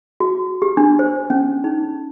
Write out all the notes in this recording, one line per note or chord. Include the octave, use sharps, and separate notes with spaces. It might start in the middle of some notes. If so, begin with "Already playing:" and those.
F#4
G4
D4
C5
C#4
D#4